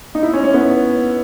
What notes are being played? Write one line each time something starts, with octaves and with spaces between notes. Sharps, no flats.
D#4
E4
C#4
C#4
B3